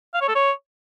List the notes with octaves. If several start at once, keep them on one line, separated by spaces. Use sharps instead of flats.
F5
C#5
A4
C#5